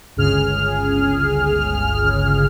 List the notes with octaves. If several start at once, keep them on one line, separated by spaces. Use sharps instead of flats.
G1 C#2 C#3 G#4 F6